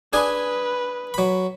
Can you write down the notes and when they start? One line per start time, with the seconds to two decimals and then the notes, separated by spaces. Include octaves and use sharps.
0.13 D4 G#4 B4 G#5
1.14 F#3 B5